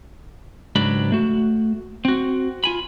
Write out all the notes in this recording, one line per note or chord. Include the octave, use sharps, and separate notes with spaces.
C#2 G#2 F#3 D4 B5
A3 F#4
C4 F#4
F4 G#5 B5